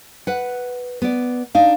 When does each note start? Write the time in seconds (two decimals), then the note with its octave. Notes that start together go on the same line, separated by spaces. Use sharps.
0.27 B4 F#5
1.02 B3 D5
1.55 D4 D#4 F5